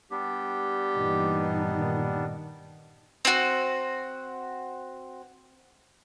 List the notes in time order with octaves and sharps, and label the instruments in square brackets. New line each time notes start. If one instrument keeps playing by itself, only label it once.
[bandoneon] G3 B3 D4 [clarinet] G4
[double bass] G2 D#4 [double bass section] A#2 E3
[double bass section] A#2 D#3
[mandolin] C4 F#4